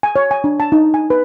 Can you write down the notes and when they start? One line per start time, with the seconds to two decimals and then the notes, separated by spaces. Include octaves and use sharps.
0.03 G#5
0.16 C#5
0.31 G#5
0.44 D4
0.60 A5
0.72 D#4
0.94 G#5
1.10 B4